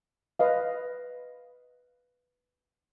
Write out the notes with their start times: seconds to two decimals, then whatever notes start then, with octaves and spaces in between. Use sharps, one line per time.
0.39 B4 D#5 F5